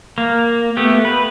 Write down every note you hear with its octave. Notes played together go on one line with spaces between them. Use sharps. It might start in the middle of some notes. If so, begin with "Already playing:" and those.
A#3
A3 B3 G4
B4